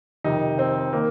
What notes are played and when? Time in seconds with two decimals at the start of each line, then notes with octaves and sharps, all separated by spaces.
0.24 F2 C3 D#3 D#4
0.59 C4
0.93 D#3 A#3